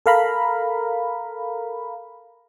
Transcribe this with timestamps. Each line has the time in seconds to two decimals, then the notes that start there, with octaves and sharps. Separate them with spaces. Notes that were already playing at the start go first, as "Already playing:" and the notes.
0.06 A4 A#4 F5 A#5 B5